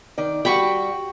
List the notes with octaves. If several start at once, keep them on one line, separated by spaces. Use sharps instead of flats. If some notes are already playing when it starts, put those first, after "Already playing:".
D#3 D5
G3 F#4 G5 B5 C#6